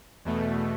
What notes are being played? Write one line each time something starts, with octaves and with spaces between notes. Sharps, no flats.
E2 B2 A3